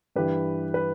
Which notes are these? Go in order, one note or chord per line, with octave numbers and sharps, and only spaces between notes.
G2 E3 G4 B4
B4